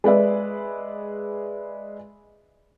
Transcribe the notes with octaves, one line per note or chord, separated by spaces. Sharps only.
G#3 B4 D5 E5